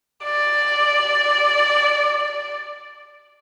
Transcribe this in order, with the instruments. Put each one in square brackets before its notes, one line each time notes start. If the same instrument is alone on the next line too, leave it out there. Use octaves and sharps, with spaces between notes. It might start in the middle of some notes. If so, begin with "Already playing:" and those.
[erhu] D5